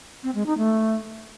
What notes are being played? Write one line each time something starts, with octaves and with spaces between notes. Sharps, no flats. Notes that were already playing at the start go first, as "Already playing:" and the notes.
C4
G#3
D#4
A3